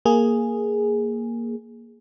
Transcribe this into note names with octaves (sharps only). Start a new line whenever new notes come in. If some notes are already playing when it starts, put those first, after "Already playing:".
A#3 G#4